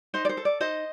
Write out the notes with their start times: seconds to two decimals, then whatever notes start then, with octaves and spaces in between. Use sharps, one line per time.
0.14 D#4 C5 D#5
0.25 D5
0.29 C5
0.37 A4
0.45 D5
0.61 D#4 C5 D#5